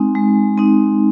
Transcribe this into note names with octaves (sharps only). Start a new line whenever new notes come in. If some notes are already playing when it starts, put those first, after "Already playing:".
Already playing: G#3 C4 D#4
G#3
C4 D#4